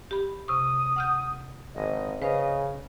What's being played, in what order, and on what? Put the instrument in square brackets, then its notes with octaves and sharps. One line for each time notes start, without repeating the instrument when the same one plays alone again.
[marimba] G4 B5
[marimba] C3 C#6 [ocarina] D#6
[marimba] F#5 F6 G6
[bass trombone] G#1 [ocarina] D#5
[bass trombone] C#3 [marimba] B4 C5 F5 [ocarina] D#5